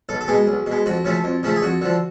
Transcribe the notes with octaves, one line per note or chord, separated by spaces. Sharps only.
B1 A4
A4
B2 G#3 G#4
B1
B2
G#3
F2 F#4
C#3 F3 A3
F2
C#3 F3 A3
G#4
F2 F#4
D3 F3